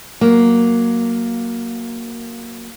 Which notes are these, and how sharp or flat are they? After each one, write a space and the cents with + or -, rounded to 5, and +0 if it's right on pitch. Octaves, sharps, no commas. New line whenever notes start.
F#3 +0 A#3 +0